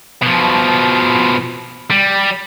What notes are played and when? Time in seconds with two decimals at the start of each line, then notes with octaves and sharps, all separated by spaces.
0.22 B2 F3
1.91 G3